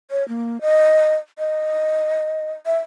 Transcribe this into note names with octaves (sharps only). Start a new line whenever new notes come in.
C#5
A#3
D#5
D#5
E5